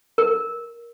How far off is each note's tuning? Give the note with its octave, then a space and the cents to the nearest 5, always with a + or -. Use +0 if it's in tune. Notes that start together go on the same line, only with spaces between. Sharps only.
A#4 +10